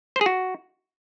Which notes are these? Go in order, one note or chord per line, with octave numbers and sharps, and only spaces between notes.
C5
G#4
F#4